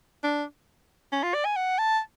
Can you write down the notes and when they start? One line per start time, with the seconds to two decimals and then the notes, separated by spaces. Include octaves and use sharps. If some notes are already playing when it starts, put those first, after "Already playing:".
0.24 D4
1.12 C#4
1.23 F4
1.34 D5
1.45 G#5
1.56 F#5
1.79 A5